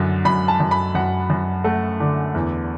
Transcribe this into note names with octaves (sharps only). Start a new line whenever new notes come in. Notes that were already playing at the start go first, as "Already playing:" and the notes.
Already playing: F#2 D3
F#2 B5
A5
F#2
B5
F#2 F#5
F#2
A3 F#5
D3
E2